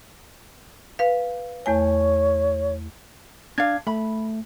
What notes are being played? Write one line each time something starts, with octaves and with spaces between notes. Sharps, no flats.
B4 F5
E2 A3 C#5 G#5
D4 F5 G#6
A3 B5